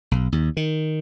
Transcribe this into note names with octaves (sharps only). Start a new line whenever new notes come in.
B1
D#2
D#3